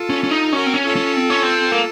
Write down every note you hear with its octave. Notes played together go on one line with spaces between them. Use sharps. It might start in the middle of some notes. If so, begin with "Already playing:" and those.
Already playing: F4 A4
C#4
C#4
D#4
C#4 F#4 A#4
C4
C#4
F4 A4
C#4
C4
C#4
C4
A#3